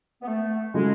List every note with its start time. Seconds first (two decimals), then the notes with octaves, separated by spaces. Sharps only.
0.22 B3
0.27 A3
0.73 C#3 F#3 G#3 A3